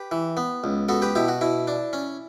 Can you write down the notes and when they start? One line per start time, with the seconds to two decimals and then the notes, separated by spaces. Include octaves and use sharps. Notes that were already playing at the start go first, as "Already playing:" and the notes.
Already playing: G4 B4
0.11 E3
0.37 B3
0.64 C#2
0.89 B3 F#4 A4
1.02 G4 B4
1.15 B2 E4 G4
1.28 F#4
1.41 B2 E4
1.67 D4
1.93 C#4